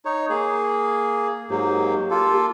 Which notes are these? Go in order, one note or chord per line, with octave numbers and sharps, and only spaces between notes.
D#4 C#5
A#3 G#4
G#2 F#3 A#3 G4
A#3 F4 A4